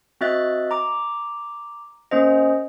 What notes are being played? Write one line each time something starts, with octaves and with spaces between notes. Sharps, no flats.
C4 F#4 D#5 E5 F#6 A6
A#5 D6
A#3 C#4 C5 D#5